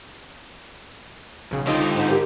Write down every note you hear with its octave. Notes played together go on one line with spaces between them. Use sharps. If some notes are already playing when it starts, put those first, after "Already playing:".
B1 C#3
D3 C4 D#4 F4 G4 D#5
G#2
G4 A#4